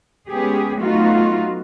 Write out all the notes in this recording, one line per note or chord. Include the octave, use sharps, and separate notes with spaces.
G#3 B3 C#4 G4 G#4
F#3 A3 B3 D#4 F4 F#4